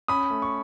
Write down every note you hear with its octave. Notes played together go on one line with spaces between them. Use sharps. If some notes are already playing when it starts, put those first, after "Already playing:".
C#4 B5 D#6
A3
C#6